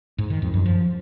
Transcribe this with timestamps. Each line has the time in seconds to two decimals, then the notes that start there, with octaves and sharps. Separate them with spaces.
0.18 G#2
0.30 D#3
0.42 F2
0.54 F#2
0.66 F3